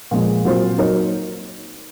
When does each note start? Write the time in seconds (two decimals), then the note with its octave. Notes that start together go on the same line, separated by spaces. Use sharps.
0.11 A#2 F3 G#3
0.45 A#2 F#3 C4 F4 C5
0.78 F#3 A#3 D#4 A#4 C#5